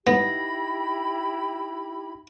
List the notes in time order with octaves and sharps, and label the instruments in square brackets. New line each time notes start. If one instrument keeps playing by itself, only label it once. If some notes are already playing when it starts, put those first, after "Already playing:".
[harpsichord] B3 [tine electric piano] D#4 A#6 [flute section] E4 G4 B5